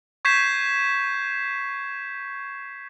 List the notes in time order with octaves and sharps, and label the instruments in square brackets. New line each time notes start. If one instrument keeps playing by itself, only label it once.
[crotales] C#6 G6 G#6 B6 C7 E7